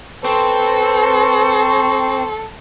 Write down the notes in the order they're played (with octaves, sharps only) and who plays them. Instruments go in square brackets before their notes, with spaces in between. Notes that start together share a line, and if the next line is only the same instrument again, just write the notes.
[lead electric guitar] C4 [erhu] A4 [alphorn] B4 [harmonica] C5 C#6